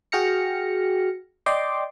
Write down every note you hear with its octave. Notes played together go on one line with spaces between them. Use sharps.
F#4 G#4 G5 F6 A#6 C#7
D5 D#5 G5 C6 D6